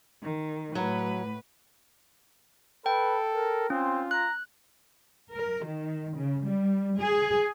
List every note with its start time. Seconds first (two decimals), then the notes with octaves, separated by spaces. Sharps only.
0.22 D#3
0.75 A2 F#3 B4
2.86 A4 B4 G5
3.34 A#4
3.70 C4 C#4 F4
4.11 A#5 F#6
5.33 A#4
5.64 D#3
6.15 C#3
6.45 G3
7.00 G#4